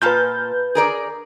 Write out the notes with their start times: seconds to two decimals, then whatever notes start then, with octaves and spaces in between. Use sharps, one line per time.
0.02 A#2 F4 B4 A5 G6
0.75 G#4 A#4 D5